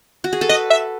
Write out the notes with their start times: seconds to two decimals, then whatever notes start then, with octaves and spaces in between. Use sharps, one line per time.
0.24 F#4
0.33 G#4
0.41 A4
0.49 B4 D#5
0.70 E5